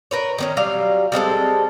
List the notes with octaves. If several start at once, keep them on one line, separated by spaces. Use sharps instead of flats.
A#4 B4 C#5
D#3 B3 C#4
F#3 G3 F5
G3 G#3 C4 A4